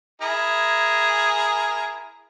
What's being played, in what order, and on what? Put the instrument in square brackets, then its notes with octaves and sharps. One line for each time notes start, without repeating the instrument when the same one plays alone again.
[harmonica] E4 G#4 A#4